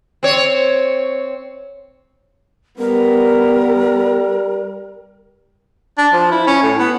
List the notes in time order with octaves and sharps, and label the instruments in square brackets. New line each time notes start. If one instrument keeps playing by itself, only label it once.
[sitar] C4 C#5
[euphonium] G3 [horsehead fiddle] B3 [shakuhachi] A#4
[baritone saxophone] D4
F3
E4
C#4
A2
B3